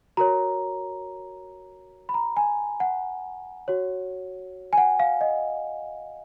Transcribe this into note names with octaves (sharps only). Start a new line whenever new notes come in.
F#4 A#4 C#5 A#5
B5
A#5
G#5
F#5
F#4 C#5
G#5
F#5
F5
D#5